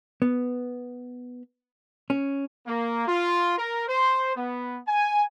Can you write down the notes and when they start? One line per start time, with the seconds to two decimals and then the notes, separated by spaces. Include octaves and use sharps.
0.22 B3
2.10 C#4
2.67 A#3
3.07 F4
3.58 A#4
3.88 C5
4.36 B3
4.88 G#5